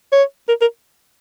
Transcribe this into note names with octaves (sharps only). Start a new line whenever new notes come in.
C#5
A#4
A#4